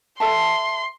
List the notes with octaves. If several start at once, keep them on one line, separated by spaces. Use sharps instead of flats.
A4 E5 A5 C6